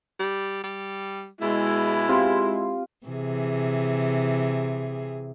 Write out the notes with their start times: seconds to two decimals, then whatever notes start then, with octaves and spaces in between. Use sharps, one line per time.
0.19 G3
0.64 G3
1.42 B2 G#3 E4
2.09 C4 F4 G4 C6
3.07 C3 E3 G#4